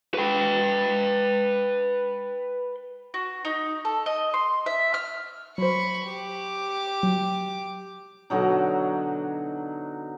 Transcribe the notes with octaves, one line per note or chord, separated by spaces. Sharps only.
B4 G5
F#4
D#4
A4
D#5
C6
E5
F6
F#3 C5 B5 C#6
G4 D6
F#3
B2 D3 F#3 D#4